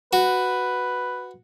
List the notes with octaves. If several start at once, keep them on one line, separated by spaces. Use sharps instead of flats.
F#4 B4